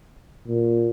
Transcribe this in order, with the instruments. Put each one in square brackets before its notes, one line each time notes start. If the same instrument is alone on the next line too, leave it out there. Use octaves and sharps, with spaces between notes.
[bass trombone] A#2